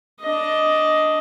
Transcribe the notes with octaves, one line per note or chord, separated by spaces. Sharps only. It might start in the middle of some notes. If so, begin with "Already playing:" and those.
D4 D#5